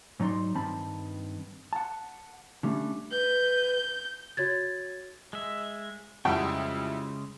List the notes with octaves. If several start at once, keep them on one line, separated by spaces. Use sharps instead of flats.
G#2 F#3 D#4 D5 C6
G2 D#3 C4 A5 B5
F#5 A5
D3 G3 A3 C#4 D4
B4 G6
F#4 C#5 G#6 A6
G#3 E5
F2 C#3 G3 G#3 E4 G5